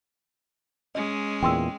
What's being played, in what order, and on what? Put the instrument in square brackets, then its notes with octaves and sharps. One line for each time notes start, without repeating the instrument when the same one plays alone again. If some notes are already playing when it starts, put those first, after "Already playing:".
[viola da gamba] G#3 C#4 [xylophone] D#5
[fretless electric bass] E2 A#2 [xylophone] G5 C6 E6